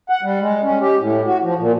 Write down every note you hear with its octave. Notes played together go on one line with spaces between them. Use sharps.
F#5
G3
G#3
C#4
G4
A2
F#4
F3
A#2